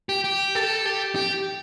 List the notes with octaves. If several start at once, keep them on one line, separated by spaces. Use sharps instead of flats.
G4
G4
A4
G4
G4